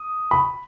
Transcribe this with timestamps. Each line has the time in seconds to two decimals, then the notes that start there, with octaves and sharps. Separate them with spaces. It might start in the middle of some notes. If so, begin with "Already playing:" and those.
Already playing: D#6
0.31 B5